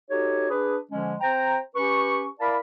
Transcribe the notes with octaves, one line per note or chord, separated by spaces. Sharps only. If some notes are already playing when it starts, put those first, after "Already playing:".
D#4 F#4 G4 A4 C#5
D4 G#4 B4
D3 F3 G#3 C#4
C4 C5 G5 A#5
C#4 G4 B4 C#6
E4 A#4 D5 F5 A5 B5